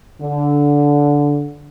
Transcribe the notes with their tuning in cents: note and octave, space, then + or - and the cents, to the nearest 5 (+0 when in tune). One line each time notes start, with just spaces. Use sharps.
D3 -15